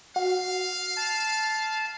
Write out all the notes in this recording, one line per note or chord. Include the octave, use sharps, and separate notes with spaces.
F#4 F5
A5